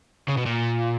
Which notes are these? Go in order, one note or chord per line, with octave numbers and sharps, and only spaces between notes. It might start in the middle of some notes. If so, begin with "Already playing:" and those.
C#3
B2
A#2